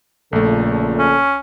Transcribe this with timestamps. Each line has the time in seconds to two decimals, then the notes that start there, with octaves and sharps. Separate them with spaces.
0.33 A#1 A#2 C#3 A3 A4
0.99 C#4